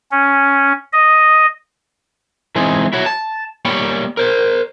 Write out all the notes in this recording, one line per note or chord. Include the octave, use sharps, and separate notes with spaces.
C#4
D#5
E3 G#3 C4 D#4 G#4
E4 F#4 C#5
A5
G3 A#3 C#5 G5 B5
A#4 C5